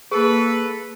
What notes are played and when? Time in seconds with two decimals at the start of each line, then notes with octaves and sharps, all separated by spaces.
0.11 A#3 G#4 A4 B4